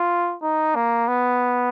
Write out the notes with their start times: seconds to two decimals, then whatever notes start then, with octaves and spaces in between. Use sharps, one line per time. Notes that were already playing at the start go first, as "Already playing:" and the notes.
Already playing: F4
0.43 D#4
0.76 A#3
1.08 B3